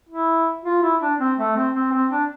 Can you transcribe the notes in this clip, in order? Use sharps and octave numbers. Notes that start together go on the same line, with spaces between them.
E4
F4
E4
D4
C4
A3
C4
C4
C4
D4